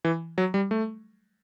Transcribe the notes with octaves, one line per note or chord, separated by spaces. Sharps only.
E3
F#3
G3
A3